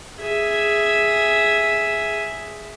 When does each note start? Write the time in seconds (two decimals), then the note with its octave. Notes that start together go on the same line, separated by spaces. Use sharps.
0.21 G#4 E5